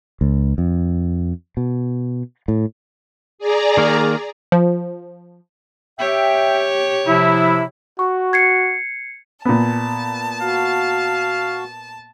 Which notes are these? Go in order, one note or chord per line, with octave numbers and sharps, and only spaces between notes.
C#2
F2
B2
A2
G#4 D5 A#5
D#3 A#3
F3
G4 C#5 E5 G5
C3 F3 E4
F#4 C#6
G#6 C7 C#7
A#2 B3 A5
F#4 F5